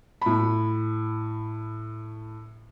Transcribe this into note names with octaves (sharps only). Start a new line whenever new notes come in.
A2 B5